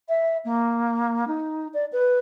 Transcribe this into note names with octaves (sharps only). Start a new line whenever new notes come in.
E5
A#3
D#4
D5
B4